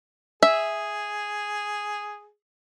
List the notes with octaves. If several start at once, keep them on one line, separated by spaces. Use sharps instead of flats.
G#4 E5